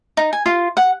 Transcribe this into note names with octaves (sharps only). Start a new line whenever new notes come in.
D#4
G#5
F4
F#5